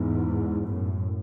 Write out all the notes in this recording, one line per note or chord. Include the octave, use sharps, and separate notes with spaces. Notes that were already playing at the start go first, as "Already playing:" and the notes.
Already playing: E2 G#2
F#2 A2